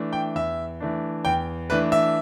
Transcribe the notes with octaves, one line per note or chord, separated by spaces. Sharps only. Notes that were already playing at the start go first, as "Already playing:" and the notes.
Already playing: E3 A3 D4
G5
E2 E5
E3 A3 D4
E2 G5
E3 A3 D4 B4
E5